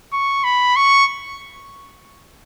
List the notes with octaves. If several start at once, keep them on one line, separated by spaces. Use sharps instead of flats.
C#6
B5
C#6